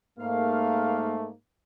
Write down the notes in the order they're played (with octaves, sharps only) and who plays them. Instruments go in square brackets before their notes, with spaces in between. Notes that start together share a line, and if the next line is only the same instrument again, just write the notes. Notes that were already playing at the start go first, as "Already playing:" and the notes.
[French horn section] G#2 A#3 [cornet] A3 [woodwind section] F5